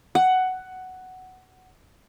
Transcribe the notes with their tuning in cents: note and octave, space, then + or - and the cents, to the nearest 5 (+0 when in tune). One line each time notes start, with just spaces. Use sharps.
F#5 +10